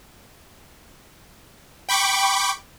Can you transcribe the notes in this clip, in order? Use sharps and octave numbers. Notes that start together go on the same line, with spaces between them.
G5 B5 C#6 D6